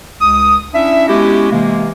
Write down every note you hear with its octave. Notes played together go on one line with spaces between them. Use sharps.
C#2 D#6
C#4 D4 E4 E5
G#3 B3 C#4 E4 F#4 G4
C3 E3 G#3 A#3